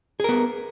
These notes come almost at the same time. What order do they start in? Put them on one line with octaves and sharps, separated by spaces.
G#4 A#4 B3